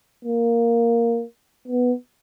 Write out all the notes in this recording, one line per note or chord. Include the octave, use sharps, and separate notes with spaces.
A#3
B3